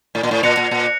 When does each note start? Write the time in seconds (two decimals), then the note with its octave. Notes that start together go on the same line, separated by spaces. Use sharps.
0.15 A2
0.23 A#2
0.31 A2
0.43 A#2 F#6 A#6 C#7 F7
0.57 A#2
0.71 A#2